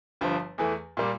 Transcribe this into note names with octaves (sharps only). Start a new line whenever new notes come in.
G1 G2 F3
E2 E3 A3
A#2 G3 A#3